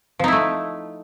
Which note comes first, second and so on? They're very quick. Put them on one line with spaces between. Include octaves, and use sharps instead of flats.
F3 D#4 E4 A3